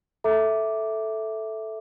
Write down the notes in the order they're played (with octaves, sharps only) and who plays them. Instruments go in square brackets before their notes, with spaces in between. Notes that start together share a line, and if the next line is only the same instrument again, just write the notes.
[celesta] A4 E5 A#5 D6